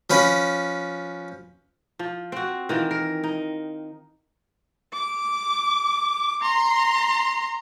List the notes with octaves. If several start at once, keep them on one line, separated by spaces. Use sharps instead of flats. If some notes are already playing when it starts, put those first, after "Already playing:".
F3 C#4 B4
F3
C4 F#4
D#3 E3 F4
A#4
D#4
D6
A#5 C6